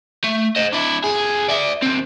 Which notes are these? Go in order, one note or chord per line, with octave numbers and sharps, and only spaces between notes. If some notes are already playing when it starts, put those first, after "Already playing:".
A3
C5 D#5
D4 E4
F2 G#4
D5 E5
D#2 C4